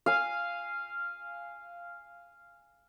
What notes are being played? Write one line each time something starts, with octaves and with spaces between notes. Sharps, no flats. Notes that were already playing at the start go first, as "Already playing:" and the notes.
F5 G#5